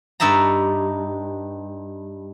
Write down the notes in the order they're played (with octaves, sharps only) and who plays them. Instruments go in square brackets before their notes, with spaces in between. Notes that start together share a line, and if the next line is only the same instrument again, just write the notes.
[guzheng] G2 D#4 E5 A5 A#5